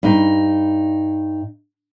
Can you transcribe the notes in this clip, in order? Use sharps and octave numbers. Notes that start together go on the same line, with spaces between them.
G2 D#4